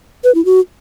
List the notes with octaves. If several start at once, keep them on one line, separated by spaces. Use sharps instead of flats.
B4
E4
F#4